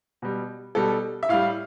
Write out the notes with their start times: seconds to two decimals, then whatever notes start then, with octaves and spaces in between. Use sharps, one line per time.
0.22 B2 G3
0.75 B2 G3 A4
1.23 E5
1.29 A2 G3 F5